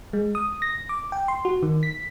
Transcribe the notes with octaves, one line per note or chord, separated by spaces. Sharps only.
G#3
D#6
A#6
D6
G5
C6
F#4
D#3
B6